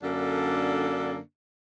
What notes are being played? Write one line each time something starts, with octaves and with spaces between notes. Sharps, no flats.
F#2 D3 A#3 D4 A4